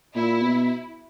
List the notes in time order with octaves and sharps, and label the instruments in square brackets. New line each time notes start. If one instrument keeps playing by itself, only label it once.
[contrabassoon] A#2 [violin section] E4
[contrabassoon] B2